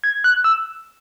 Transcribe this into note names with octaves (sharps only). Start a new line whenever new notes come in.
G#6
F#6
E6